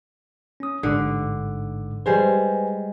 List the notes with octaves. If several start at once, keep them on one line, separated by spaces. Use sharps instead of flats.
C#4 D#6
A1 G#2 D3 D6
G3 G#3 B4 C5 G#5